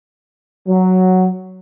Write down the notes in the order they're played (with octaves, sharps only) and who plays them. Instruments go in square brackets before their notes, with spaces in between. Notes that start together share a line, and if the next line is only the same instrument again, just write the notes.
[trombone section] F#3